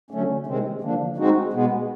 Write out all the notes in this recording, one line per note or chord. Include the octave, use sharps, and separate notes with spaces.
D3 F#3 A3 C#4
C3 D#3 G#3 C4
D3 F3 A#3 D4
G#3 C4 D#4 F#4
B2 G#3 B3